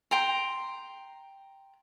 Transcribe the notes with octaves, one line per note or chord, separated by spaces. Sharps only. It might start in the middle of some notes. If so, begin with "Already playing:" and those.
G5 A#5 C6